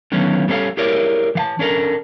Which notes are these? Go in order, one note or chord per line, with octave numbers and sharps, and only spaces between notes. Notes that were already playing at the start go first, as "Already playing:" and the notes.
D3 D#3 F#3 B3 C#4
G3 B3 C#4 D4 A4 F5
E4 G4 G#4 A#4 C#5 D5
E3 F5 A5
C#4 D4 A4 A#4